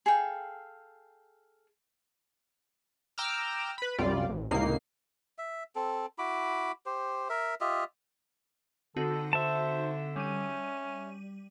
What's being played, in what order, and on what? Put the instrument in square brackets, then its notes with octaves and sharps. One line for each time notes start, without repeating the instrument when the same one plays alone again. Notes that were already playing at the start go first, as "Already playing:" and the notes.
[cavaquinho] G#4 A4 F5 G5
[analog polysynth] G5 A#5 D6 E6 F6
B4 B5
C2 F#2 G3 F4 D5
A1
C#2 A2 C3 A#3 D#4 C7
[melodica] E5
C4 A4
E4 F#4 B5 D6
G4 C5
A#4 E5
F4 G4 D#5 E5
[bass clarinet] D3 [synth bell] C4 D#4 F#4 [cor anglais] A4
[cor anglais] C5 [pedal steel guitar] E5 A5
[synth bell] G3 D#7 [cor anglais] C#4